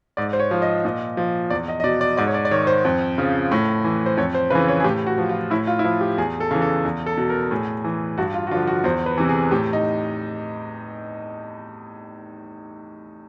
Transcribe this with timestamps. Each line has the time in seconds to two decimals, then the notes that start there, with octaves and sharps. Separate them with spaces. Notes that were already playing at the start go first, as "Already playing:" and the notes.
0.17 G#2 D5
0.33 C5
0.40 C#5
0.51 F3
0.62 D#5
0.85 A#2 D#5
1.17 F3
1.50 E2 D5
1.68 D#5
1.80 D#5
1.84 B2 D5
2.01 D5
2.17 G#2 D5
2.27 C#5
2.34 D5
2.45 D5
2.51 D#3 C#5
2.67 C5
2.85 F2
3.18 C#3 F3
3.52 A2
3.84 E3
4.06 C5
4.17 F2 C#5
4.35 C5
4.50 C#3 E3 B4
4.68 C#5
4.80 G#4
4.84 A2 G4
5.07 F#4
5.18 F3
5.29 F4
5.50 A2 E4
5.67 F4
5.79 E4
5.84 F3 F4
6.01 G4
6.17 E2 G#4
6.40 A4
6.51 C#3 E3
6.62 A4
6.85 E2
7.06 A4
7.17 B2
7.30 A#4
7.51 A2 G#4
7.84 E3
8.18 G2 F#4
8.34 F4
8.47 F#4
8.51 D3 F3 F4
8.67 F#4
8.84 E2 C5
9.06 B4
9.18 C3 E3
9.29 G#4
9.51 A2 G4
9.73 D#4